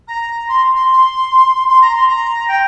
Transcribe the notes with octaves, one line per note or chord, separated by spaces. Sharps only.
A#5
C6
C6
C6
A#5
C6
A#5
G5